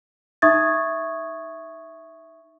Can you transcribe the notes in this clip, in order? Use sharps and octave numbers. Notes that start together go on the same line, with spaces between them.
D#4 E5 C#6 D#6 G#6 A6